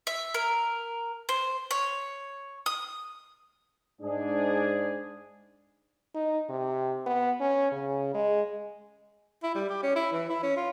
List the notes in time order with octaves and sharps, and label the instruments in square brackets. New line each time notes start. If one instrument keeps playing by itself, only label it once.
[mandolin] E5
A#4
C5
C#5
D#6
[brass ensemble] G#2 D4 G#4
[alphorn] D#4
C3
B3
C#4
C#3
G#3
[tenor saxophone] E4
G3
G4
C#4
E4
E3
E4
C#4
F4